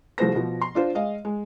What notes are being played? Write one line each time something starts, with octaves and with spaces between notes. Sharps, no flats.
C2 F3 A3 G#4 C5 A#6
B2 F3
C6
D4 F4 C5
G#3 D#5 F5
G#3